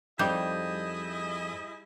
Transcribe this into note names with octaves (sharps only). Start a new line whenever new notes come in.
F2 G3 D#4 E4 G#4 D#5 G6